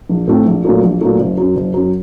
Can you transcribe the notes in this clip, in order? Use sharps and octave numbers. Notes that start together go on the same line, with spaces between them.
A#1
A2 A3 C4
A#1
A#2 F#3 A3
A#1
A#2 F#3 A3
F#1
F#2 F#3
F#1
F#2 F#3